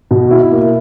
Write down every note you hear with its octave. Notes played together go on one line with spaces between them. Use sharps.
B2
E4
A#3